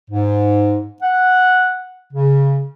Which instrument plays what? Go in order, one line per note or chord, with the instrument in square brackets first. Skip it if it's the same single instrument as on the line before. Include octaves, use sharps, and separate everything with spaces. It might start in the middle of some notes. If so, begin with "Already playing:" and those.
[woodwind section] G#2
F#5
C#3